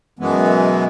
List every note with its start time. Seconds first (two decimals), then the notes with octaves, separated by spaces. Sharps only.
0.19 F#2 B2 E3 G#3 B3